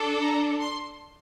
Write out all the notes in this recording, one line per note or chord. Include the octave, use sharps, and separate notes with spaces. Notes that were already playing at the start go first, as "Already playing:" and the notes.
Already playing: D4 A4
A#5
C6